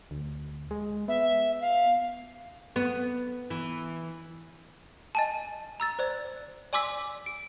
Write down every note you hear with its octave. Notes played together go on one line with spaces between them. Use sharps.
D2
G#3
B3 E5
F5
B3
E3
D#5 G#5 A5
A#5 E6 A6
C5 D5
D5 G#5 C6 D6 E6 B6
D7